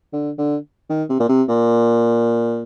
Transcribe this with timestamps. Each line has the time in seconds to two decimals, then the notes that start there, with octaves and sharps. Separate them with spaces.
0.13 D3
0.38 D3
0.89 D#3
1.09 C3
1.20 A#2
1.29 C3
1.48 A#2